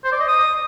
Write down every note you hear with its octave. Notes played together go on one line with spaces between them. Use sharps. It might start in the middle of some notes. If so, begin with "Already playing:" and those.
C5
D5
D#5
D#6